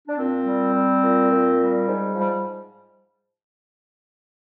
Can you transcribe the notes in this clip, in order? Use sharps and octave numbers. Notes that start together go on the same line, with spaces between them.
D4
A#2 C4
G3
G3
A#2
A#2
G3
G#2
F3
G3